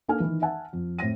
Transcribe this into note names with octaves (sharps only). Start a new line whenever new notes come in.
A#3 D4 A4 G#5 F6
D#3 E3
E5 F#5 G#5 A5
F2
A2 C4 A#6 D#7